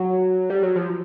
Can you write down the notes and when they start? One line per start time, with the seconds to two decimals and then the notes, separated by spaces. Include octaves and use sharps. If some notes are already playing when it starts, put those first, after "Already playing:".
Already playing: F#3
0.50 G3
0.63 F#3
0.76 F3